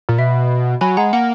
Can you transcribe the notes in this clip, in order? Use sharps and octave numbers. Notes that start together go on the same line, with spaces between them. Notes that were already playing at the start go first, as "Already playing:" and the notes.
A#2
B2 E5
F#3 G#5 B5
G#3 F#5 A#5
A#3 F#5